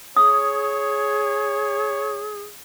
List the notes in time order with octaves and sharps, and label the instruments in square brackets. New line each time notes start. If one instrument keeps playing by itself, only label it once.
[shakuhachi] G#4 [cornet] C#5 [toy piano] D#6